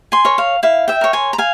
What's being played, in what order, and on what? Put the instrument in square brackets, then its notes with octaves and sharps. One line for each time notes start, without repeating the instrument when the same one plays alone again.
[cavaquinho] G#5 C6
A#4 C#5
F5
E4 F5
E5 G5
A#4 C#5
G#5 C6
A#5
F5 G#5